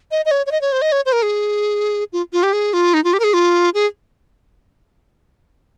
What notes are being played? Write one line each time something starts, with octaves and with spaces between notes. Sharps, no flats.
D#5
D#5
C#5
C#5
D#5
C#5
C5
D#5
C#5
C5
A#4
G#4
F4
F4
G4
G#4
F4
D#4
F4
G4
A#4
G#4
F4
G#4